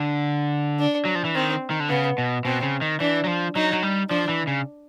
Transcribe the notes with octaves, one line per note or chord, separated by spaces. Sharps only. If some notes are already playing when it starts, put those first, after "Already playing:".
Already playing: D3
D4
F#3
F3
E3
D#3 C4
D#3
D3
C#3 B3
B2
B2 C4
C#3
D#3
E3 D4
F#3
F3
F#3 D#4
F#3
G3
F3 D4
E3
C#3